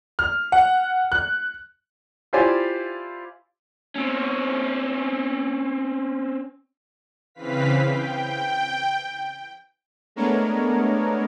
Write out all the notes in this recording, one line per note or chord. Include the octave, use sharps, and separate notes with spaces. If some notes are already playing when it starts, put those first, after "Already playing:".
F6
F#5
F#6
E4 F4 G4 C5 D5 G#5
C4 C#4
C#3 E3 C4 B4 F5 B6
G5
G#3 A3 B3 D4 A#4 C#5